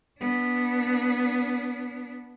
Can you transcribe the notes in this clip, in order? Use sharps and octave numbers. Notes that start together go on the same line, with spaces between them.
B3 D4